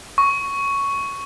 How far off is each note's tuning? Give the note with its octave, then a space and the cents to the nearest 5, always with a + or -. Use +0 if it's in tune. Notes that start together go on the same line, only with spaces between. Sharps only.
C#6 +5